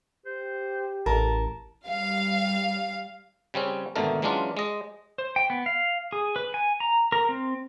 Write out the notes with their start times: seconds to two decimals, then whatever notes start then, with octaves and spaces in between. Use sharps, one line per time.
0.26 G4 C5
1.06 A1 A#4 A5
1.88 G3 F5
3.54 C#3 G3 C4 C#4
3.96 G#1 B2 D3 A3 A#4
4.22 E3 F#3 G#3 C#4 D4 F4
4.57 G#3 D#5
5.18 C5
5.36 G5
5.50 B3
5.66 F5
6.12 G#4
6.36 B4
6.54 G#5
6.80 A#5
7.12 A#4
7.29 C4